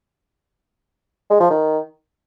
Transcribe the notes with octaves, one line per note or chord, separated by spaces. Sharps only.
G#3
F3
D#3